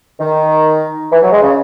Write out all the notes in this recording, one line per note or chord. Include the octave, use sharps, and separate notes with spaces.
D#3
E3
F#3
G#3
C#3